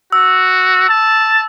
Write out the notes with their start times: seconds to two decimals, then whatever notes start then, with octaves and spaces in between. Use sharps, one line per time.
0.12 F#4 E6
0.89 A5